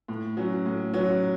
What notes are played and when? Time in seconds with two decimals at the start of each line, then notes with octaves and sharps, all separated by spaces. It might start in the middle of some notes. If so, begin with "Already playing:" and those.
0.08 A2
0.37 F#3 C#4
0.66 A2
0.94 F#3 C#4